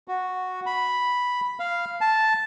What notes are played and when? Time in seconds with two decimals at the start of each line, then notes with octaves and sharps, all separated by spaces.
0.08 F#4
0.66 B5
1.60 F5
2.01 A5